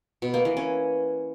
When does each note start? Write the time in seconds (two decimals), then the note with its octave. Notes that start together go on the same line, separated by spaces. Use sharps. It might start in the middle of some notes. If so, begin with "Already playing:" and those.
0.22 B2
0.34 A#3
0.45 E3
0.57 C#4